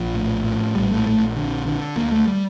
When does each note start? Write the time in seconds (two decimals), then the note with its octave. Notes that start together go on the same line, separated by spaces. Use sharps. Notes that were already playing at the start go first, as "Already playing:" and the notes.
Already playing: A#1 F3
0.14 A2
0.44 A2
0.75 A#1 G3
0.91 A3
1.06 A#1 A3
1.36 D3
1.66 D3
1.96 D2 A#3
2.12 A3
2.27 G3